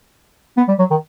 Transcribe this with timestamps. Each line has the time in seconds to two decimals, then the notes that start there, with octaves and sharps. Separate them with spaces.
0.57 B3
0.68 G3
0.79 F#3
0.91 D#3